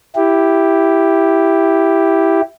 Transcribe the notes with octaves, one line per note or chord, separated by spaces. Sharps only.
E4 G4